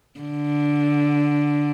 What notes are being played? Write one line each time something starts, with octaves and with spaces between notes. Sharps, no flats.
D3